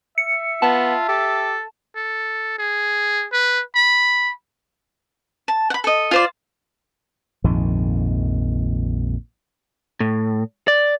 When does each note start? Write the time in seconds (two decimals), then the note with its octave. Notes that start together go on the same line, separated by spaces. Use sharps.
0.18 E5 C#7
0.62 B3 F4 A5
1.09 G4 A4
1.96 A4
2.59 G#4
3.33 B4
3.75 B5
5.48 A5
5.70 F#5 B5
5.84 A4 D#5
6.11 F4 C5 D5
7.44 A#1 F2 G#2 D#3
10.00 A2
10.68 D5